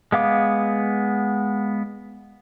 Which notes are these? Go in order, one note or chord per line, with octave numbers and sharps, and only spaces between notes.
G#3 B3 F5 D6